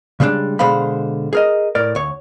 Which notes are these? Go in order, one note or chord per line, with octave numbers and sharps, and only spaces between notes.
C#3 G3 G#3 A#3 D4
B2 D3 G#3 C5 F5 B5
G#4 A#4 D#5
A2 A#4 D5
D2 C#5